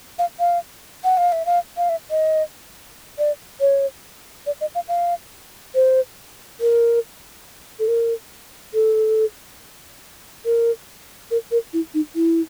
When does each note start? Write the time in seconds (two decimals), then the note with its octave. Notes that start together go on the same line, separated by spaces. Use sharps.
0.19 F5
0.39 F5
1.04 F#5
1.17 F5
1.32 E5
1.46 F5
1.77 F5
1.89 E5
2.10 D#5
3.19 D5
3.60 C#5
4.46 D5
4.61 D#5
4.75 F5
4.88 F5
5.75 C5
6.61 A#4
7.79 A4
7.88 A#4
8.74 A4
10.45 A#4
11.31 A#4
11.51 A#4
11.73 E4
11.94 D#4
12.15 E4